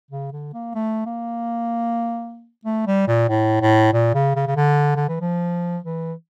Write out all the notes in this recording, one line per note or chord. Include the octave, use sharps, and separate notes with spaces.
C#3
D3
A#3
A3
A#3
A3
G3
A#2
A2
A2
A#2
C#3
C#3
C#3
D3
D3
E3
F3
E3